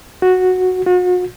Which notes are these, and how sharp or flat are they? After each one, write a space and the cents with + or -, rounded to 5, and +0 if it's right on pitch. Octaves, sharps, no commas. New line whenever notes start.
F#4 -5
F#4 -40